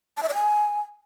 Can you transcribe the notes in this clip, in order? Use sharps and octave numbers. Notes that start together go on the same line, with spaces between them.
A5
E5
D5
G#5